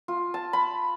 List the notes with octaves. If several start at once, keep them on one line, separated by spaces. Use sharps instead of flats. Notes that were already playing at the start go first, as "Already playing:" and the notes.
F4
A5
B5